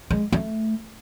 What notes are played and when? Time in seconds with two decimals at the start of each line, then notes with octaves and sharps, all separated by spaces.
0.10 G#3
0.32 A3